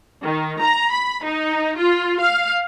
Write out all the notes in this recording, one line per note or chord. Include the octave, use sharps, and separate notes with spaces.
D#3
A#5
B5
D#4
F4
F5